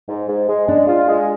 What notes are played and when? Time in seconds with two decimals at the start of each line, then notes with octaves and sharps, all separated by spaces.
0.09 G#2
0.28 G#2
0.48 G#3
0.68 G#3 D4
0.88 F4
1.07 G#3